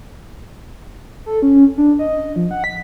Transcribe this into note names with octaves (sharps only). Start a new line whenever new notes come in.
A4
C#4
D4
D#5
F3
F#5
B6